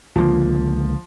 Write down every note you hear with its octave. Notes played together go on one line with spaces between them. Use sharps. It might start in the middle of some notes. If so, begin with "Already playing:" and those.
C#2 D3 F3 A#3